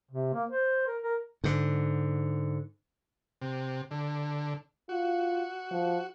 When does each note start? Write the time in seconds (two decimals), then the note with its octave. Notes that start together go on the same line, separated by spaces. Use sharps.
0.11 C3
0.33 A#3
0.50 C5
0.87 A#4
1.02 A#4
1.44 G#2 D3
3.41 C3
3.91 D3
4.89 F4 F#4
5.71 F3